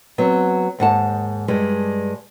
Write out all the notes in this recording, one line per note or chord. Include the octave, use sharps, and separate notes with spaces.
F#3 B3 C4
D#2 G#2 F#5 A5
G2 G3 G#3